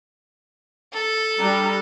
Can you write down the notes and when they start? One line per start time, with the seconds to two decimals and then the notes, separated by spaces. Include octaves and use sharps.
0.93 A4
1.36 G3 D4 A#5